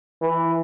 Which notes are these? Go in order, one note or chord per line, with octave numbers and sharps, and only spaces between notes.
E3